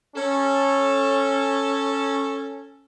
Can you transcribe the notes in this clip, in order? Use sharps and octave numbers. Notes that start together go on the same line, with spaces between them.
C#4 A4